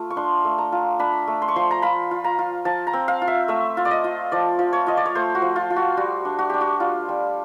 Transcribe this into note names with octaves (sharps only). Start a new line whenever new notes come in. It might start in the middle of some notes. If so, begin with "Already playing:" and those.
Already playing: A3 F4
C#6
D4 C6
A3
A#5
F4
D4 B5
A3
C6
C#6
F3 C6
A#5
F4 B5
F4
A#5
F4
F3 A5
A#5
C4
F5
F4
E5
A3 E5
F4
D5
D#5
F4
F3 D5
F3
C#5
F4 D#5
D5
C#5
A3 C5
F#4
F3
F4
F4
F#4
G3 F#4
D4
F#4
D4 G4
F#4
G3 F4
G3